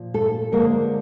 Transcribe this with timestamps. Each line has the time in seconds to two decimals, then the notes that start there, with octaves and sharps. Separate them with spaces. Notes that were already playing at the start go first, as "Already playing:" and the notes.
Already playing: A#2 F3
0.14 A3 A4
0.52 D3 F3 G#3 A#3 A#4